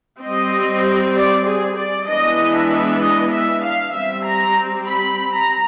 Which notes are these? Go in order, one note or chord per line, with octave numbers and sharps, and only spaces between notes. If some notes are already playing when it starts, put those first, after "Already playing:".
G3 C4 D#5
D5
G#4
D5
E3 G#3 B3 D4 D#5
E5
D#5
E5
F5
G3 C4 E5
A#5
B5
A#5